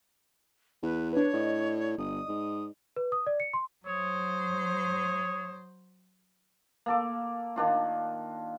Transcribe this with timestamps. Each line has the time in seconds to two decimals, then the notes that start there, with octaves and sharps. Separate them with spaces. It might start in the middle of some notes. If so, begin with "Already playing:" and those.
0.82 E2 B4
1.13 D4 B4 C#5
1.33 A2 D5 D#5
1.98 G1 D#6
2.28 G#2
2.96 B4
3.12 D#6
3.27 D5
3.40 C#7
3.54 C6
3.86 F#3 C5 C#5 D#6
6.86 A#3 A4 D6
7.56 D#3 D4 F4